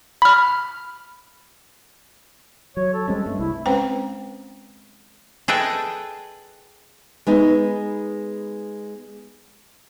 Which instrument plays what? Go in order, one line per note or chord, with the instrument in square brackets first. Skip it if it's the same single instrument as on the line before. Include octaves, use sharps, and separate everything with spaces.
[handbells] B5 F6
[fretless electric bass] F#3 [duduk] C#5
[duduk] A4
[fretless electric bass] G3 C4 C#4 [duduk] G#3
[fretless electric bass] G2 [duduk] A3
[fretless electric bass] C2 [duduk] E4
[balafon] G#3 C4 C#4 B4 C5 G5
[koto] G#4 A4 B4 D#5 G5
[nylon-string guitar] G#3 B3 D#4